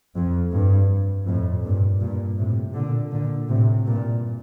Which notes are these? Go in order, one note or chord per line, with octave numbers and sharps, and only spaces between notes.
F2
G2
F2 A2
G2 A#2
G2 A#2
A2 C3
A#2 D3
A#2 D3
A2 C3
G2 A#2